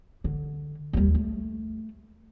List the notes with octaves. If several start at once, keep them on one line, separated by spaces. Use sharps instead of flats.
D3
D#2 G3
A3